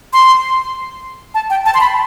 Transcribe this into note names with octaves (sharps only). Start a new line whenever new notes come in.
C6
A5
G5
A5
C6
B5